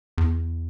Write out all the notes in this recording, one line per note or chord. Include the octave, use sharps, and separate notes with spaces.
E2